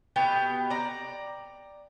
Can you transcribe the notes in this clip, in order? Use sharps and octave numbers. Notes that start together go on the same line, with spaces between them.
B2 B3 G4 G5
D5 A#5